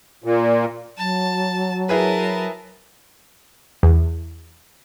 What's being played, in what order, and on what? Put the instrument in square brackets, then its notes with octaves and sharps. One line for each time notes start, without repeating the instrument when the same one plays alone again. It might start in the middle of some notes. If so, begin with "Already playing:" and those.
[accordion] A#2
[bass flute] F#3 [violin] A5
[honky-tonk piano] E4 G#4 B4 [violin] A#4 A5
[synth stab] E2